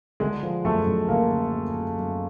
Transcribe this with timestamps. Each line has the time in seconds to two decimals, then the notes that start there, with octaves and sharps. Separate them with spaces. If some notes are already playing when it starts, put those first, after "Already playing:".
0.20 D3 G#3 G#4
0.43 F3
0.64 F#2 A3 A4
0.86 F#2
1.08 D3 A#3 A#4
1.31 D3
1.52 F#2
1.74 F#2
1.97 F#2